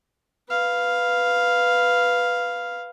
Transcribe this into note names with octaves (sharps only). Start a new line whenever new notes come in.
B4 F5